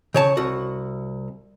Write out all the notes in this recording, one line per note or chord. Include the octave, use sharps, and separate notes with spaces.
C#3 C#5 A5
C2 F#4